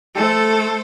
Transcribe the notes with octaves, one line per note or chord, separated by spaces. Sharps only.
A3 A4 C5